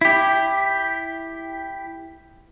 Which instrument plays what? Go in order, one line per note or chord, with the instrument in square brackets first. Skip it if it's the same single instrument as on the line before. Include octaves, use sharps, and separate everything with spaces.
[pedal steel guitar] E4 G4